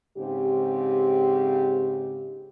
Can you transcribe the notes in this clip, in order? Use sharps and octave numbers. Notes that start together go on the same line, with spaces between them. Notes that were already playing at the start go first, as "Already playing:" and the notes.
G#2 C#3 C4 G4